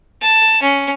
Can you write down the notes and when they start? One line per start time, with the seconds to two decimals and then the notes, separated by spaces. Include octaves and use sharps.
0.22 A5
0.62 C#4